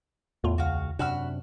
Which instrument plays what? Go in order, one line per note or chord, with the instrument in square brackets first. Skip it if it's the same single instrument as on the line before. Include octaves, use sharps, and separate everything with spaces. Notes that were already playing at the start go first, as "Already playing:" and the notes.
[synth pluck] E2 F4 [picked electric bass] A2
[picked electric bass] C#2 [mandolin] F#4 F5
[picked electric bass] F#2 C3 D4 [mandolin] F#4 B5 F6